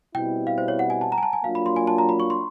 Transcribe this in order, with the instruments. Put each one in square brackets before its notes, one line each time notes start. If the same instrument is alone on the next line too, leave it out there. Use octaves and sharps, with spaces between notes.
[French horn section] B2 G3 C4 E4 [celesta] G5
[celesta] F5
C5
C#5
F#5
G#5
A5
A#5
G#5
A5
G#5
[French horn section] F#3 A#3 D4 F4 [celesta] F5
[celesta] B5
C6
G#5
A5
A#5
B5
C#6
C6